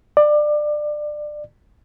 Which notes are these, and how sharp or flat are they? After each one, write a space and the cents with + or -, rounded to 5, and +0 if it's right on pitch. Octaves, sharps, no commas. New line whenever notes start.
D5 +20